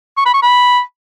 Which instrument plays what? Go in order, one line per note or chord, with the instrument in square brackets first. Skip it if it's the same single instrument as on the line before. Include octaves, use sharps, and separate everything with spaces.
[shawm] C#6
B5
C#6
B5